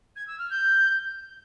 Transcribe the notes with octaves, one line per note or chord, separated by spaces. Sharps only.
G#6
E6
F6
G6